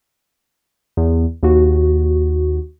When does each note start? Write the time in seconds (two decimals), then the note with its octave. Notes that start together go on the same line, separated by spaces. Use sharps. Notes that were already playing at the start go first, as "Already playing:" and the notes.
0.97 E2
1.43 D#2 F#4